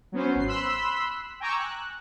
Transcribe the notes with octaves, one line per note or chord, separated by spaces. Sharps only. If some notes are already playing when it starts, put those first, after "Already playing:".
F#3 B3 C#4 C5
G#1 C7
B5 C6 E6 F#6 B6
G5 G#5 A#5 C#6 D6 E6
F#6